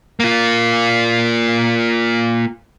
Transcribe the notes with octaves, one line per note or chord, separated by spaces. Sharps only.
A#3 F4